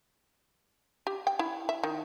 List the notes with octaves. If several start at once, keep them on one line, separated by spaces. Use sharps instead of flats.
G4
G5
E4
E5
D#3